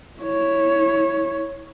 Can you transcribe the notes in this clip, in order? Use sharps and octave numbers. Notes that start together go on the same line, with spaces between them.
E4 C#5